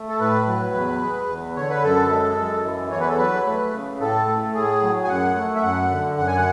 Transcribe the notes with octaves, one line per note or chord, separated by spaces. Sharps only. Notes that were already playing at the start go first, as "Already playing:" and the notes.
Already playing: A3
A4
A2 B4
F#3
E2
G#3
E2
D3 C#5
B4
F#2 A4
G#3
F#2
E3
E2 C#5
B4
A4
F#3 B4
A3
C#3
A2 A4
A3
A2 G#4
F#3
G#5
F#2 F#5
A3
E5
F#2 F#5
D3
F#2 F#5
G#5
F#5